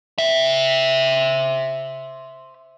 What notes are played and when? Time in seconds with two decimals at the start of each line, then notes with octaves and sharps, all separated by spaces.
0.18 C5 E5